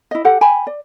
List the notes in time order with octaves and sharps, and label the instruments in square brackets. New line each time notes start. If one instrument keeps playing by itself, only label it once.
[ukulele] E4 D#5
G4 A4 F#5
G5 G#5 B5
D5